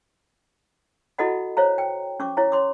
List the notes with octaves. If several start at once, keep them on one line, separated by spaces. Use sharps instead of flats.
E4 F#4 A4 D#5 F#5 B5
C5 C#5 F5 A#5
G5
C#4 C#6 D6
E4 C#5 F5 A#5
C#5 C6 D6